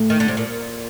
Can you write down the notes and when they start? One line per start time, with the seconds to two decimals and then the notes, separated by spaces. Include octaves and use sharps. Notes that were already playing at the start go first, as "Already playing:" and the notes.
Already playing: A2
0.10 D#3
0.20 D3
0.28 C3
0.37 A#2